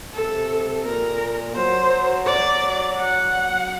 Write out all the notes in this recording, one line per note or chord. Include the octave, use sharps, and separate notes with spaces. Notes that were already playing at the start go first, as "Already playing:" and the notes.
C3 A4
A#2 A#4
F#3 C5
D5
F#5